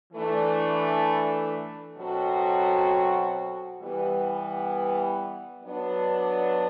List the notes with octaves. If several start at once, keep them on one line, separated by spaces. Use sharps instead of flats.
E3 A3 D4
B2 F#3 C4 F#4 A4
E3 G3 B3
F#3 B3 D4